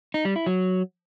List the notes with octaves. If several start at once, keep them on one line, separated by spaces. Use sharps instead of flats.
D#4
G3
E4
F#3